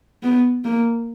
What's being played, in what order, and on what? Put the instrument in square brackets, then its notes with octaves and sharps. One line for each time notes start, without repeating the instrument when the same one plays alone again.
[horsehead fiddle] B3
A#3